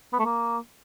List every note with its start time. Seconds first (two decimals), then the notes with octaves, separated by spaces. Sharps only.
0.13 B3
0.19 A3
0.25 A#3